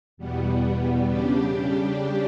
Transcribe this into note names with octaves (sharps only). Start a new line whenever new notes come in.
E2 B2 G3 B3
C#3 G3 D4 G4